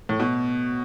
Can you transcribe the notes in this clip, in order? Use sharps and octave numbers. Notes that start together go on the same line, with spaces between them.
A2
B2